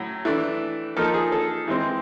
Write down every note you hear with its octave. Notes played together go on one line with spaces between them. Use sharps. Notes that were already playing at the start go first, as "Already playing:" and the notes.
Already playing: A2 F#3
E3 A3 D4
F3 A#3 D#4 A4
G#4
A4
E3 G#3 C4